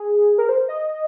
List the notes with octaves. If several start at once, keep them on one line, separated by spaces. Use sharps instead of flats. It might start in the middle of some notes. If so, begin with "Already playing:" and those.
Already playing: G#4
A#4
C5
D#5